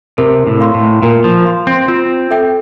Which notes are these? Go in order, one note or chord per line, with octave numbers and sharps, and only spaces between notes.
C3 A#4
A2
F5 C6
A2
A#2 A#4
F3
F5 C6
C4
C4 F4
A4 E5 G5